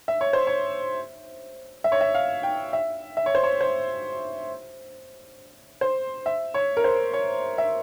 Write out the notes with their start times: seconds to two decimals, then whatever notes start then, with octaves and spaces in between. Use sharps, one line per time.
0.08 E5
0.21 C#5
0.33 C5
0.47 C#5
1.84 E5
1.92 C#5
2.01 E5
2.14 F5
2.43 G5
2.73 E5
3.17 E5
3.26 C#5
3.35 C5
3.43 C#5
3.61 C5
5.81 C5
6.26 E5
6.54 C#5
6.77 A#4
6.84 C5
7.13 C#5
7.58 E5